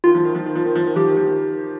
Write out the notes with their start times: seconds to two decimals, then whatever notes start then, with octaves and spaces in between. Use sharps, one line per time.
0.04 D#3 F4
0.15 F3
0.25 D#3
0.35 F3
0.46 D#3
0.56 F3
0.65 D#3
0.76 F3
0.87 D#3
0.96 F3 G4
1.07 D#3
1.17 F3
1.27 D#3